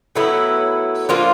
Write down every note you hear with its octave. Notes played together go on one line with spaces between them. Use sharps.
A2 F#3 B3 E4
F3 A#3 D4 F4